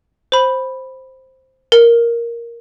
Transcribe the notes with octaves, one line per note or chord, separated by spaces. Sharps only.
C5 B5
A#4